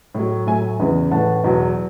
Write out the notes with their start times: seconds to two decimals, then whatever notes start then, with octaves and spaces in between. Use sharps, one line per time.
0.15 A2 F#3
0.47 A2 F#3 E5 G#5
0.80 E2 C#3 E3
1.11 A2 E3 F#5 A5
1.44 E2 B2 F#3